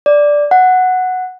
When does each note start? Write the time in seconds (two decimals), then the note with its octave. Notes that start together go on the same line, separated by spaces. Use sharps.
0.06 D5
0.51 F#5